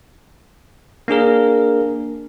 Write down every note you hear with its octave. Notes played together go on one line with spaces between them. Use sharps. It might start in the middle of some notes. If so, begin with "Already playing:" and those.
A#3 D4 G#4 A#4